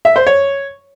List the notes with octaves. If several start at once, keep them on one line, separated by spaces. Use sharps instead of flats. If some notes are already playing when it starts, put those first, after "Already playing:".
E5
C5
C#5